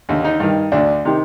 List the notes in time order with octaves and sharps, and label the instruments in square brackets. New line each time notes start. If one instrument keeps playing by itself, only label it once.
[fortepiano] D#2 D3
D#4
G2 D#3
D2 D3 D4
C3 D#3